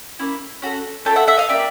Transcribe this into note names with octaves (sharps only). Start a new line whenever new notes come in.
A#3 C#4 E4
C#4 F#4 A4
A3 C#4 F4 A4 G5 A5
E5 F#5
E5 F#5
D#5 F5
A#3 D4 G4 D5 E5